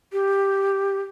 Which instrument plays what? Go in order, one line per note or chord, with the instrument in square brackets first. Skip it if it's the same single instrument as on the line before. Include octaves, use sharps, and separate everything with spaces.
[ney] G4